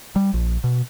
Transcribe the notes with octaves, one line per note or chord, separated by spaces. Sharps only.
G3
A#1
B2